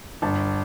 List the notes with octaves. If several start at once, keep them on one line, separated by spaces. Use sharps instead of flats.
G1 A5